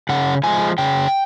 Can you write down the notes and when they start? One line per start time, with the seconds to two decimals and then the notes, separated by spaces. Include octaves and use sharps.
0.09 C#3 F#5
0.44 F3 G#3 G#5
0.78 C#3 G5